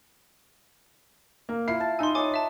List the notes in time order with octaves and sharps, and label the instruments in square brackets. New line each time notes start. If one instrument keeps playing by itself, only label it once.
[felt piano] A#3
[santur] E4 F4 [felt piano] C7
[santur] A5
[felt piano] D#4 E6 [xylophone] G#5 C6
[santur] C#5 D#5 F#5 [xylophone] G#5 D6
[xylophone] E5 A5